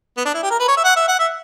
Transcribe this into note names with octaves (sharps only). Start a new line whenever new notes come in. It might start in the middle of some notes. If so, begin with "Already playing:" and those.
B3
D4
E4
G4
A#4
B4
C#5
E5
F#5
E5
F#5
E5